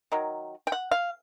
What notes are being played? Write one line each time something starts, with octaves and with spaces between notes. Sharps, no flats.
D#3 F#3
G5
F#5
F5